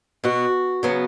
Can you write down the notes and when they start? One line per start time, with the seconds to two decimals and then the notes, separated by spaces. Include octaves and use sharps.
0.24 B2 B3 F#4
0.83 C#3 F#3 B3